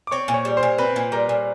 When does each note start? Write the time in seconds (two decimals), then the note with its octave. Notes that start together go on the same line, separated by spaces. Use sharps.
0.07 D6
0.11 C4 C#5 C#6
0.28 A#2
0.34 C#5 C#6
0.45 G3
0.57 C5 C6
0.63 A#2
0.78 C4 B4 B5
0.96 A#2
1.12 G3 A#4 A#5
1.29 A#2